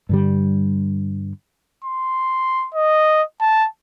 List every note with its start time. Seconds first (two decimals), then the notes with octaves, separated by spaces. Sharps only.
0.09 G2 D3 G3
1.84 C6
2.74 D#5
3.41 A5